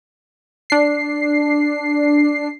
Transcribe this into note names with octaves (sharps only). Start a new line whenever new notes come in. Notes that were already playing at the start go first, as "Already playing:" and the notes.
D4 C7